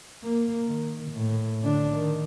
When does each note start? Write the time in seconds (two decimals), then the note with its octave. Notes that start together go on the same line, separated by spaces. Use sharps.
0.24 A#3
0.68 D#3
1.12 A2
1.63 D3 D4
1.94 D#3